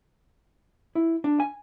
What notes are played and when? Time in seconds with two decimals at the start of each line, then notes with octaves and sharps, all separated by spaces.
0.95 E4
1.24 D4
1.40 G#5